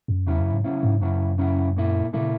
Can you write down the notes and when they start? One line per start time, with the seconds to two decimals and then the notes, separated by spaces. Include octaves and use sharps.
0.08 F#2
0.27 E2 C#3 F#3 C#4 E4
0.40 F#2
0.52 G#2
0.64 C#3 F#3 C#4 E4
0.83 G#2
1.01 F#2 C#3 F#3 C#4 E4
1.38 C#3 F#3 C#4 E4
1.76 A#2 A#3 E4
2.13 A#2 C#3 A#3 E4